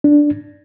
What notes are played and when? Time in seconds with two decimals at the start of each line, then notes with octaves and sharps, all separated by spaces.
0.04 D4